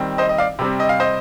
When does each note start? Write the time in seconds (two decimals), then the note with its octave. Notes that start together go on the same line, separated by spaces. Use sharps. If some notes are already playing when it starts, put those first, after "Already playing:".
Already playing: D#3 G3 C4
0.18 C5 D#5
0.29 D#5
0.38 D5 F5
0.59 C3 G3 C4
0.80 D#5
0.89 F5
1.00 C5 D#5